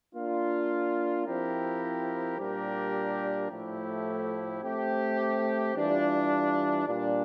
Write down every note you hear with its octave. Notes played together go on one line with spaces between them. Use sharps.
A#3 D4 F4
F3 C4 E4 G4 A#4
A#2 G3 D4 G4 A#4
A2 F3 A3 E4 G4
A3 C4 G4
E3 G3 D4 F4
A#2 G3 D4